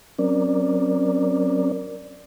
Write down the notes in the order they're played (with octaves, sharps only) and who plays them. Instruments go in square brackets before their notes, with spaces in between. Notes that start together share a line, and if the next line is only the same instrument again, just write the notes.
[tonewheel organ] F#3 C4 C#4 A#4 D5